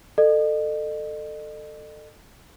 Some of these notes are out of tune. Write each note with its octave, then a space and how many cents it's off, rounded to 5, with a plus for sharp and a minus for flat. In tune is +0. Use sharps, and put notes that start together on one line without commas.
A4 +15 D#5 -40